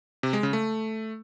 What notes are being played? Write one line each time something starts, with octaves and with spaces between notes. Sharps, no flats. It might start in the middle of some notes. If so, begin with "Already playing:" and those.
C3
G#3
C#3
A3